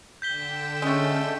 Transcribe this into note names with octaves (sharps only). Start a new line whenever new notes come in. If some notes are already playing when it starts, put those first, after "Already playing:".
D3 G5 G6 B6 E7 G7
G#3 A3 C#4